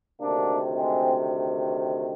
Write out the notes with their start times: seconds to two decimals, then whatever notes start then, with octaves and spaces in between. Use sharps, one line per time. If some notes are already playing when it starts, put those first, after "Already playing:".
0.21 D2 C3 D#3 A#3 D4
0.75 G#3 C4